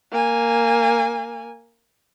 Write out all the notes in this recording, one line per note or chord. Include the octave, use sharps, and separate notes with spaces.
A#3 G#5